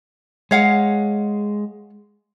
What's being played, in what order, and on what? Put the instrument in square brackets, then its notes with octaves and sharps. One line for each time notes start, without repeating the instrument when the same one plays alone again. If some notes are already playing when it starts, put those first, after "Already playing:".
[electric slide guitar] G#3 [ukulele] C#5 F5 F#5